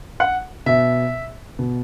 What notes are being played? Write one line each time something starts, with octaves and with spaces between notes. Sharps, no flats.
F#5
B2 E5
B2